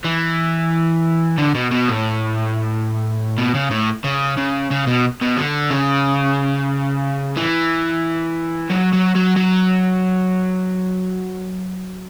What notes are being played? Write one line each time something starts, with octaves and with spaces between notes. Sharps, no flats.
E3
D3
B2
B2
A2
B2
C#3
A2
C#3
C#3
C#3
B2
B2
D3
C#3
E3
F#3
F#3
F#3
F#3